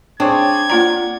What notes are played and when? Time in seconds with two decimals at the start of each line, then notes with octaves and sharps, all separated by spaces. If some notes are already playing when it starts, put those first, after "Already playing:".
0.20 C4 D4 G#4 C#5 G#6
0.70 A#3 F4 D5 F#5 A#5